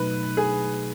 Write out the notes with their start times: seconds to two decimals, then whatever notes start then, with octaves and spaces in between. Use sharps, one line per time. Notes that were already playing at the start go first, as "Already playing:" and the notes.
Already playing: B2 F#3 A3 D#4 B4
0.37 G#4